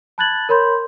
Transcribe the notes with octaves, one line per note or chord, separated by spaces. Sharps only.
A5 B5 F#6 G#6 A6 F#7
A#4 C#5 B5 C6 G6